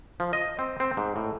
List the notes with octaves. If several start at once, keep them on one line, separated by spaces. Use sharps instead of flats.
F3
D#5
C4
C4
G#2
A2